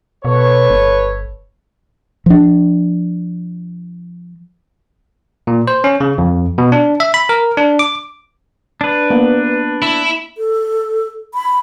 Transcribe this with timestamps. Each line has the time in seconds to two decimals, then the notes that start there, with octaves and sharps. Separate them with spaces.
0.25 B2 A4 B4 C#5
0.70 G1
2.26 F3 D4
5.47 A#2
5.68 C5
5.84 C#4
6.00 C#3
6.18 F2
6.58 B2
6.72 D4
7.00 E5
7.14 B5
7.29 A#4
7.57 D4
7.79 D6
8.81 D4 B4
9.10 A#3 B3
9.82 E4
10.38 A4
11.34 B5